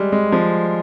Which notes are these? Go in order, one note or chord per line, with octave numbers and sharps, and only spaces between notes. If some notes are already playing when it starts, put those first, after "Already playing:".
Already playing: G3 G#3
G#3
F3